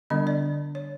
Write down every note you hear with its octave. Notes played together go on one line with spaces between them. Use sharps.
D3 G3 B3 D4 D#5
D5
C#5